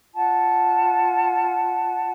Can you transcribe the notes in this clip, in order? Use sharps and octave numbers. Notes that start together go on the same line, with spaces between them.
F4 F#5 A5